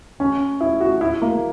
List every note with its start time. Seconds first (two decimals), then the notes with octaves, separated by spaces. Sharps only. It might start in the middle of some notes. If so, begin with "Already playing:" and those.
0.20 C#4
0.61 E4
0.81 F#4
1.01 E4
1.22 A#3